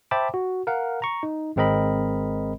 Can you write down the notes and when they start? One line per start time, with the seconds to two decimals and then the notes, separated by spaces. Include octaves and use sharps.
0.11 C5 E5 G5 A5 B5 D6
0.34 F#4
0.67 A#4 F5 F#5
1.02 A#5 C#6
1.23 D#4
1.56 G#1 G#3 C4 A#4 D#5 B5